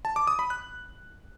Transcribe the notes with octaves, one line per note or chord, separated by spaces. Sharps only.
A5
D6
D#6
B5
F#6